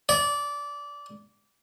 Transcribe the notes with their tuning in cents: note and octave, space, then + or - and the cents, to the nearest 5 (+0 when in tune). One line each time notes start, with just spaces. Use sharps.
D5 -20